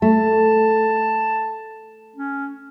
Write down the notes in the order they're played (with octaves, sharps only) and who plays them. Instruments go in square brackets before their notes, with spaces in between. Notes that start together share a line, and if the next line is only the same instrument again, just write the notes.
[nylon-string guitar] A3 [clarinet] A5
[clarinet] C#4